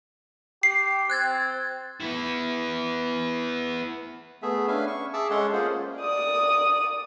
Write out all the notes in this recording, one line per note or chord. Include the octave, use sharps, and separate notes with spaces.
G4 C7
C4 F#6 G#6 A6
B3 E4
A3 B3 G#4 E5
C#4 D4 B4 E5 F5 G#5
C#6
G#4 E5 A5 D6 E6
G#3 C#4 A4 C#5 F#5 C6
A#3 C#4 F4 G#4 C5
D5 D#6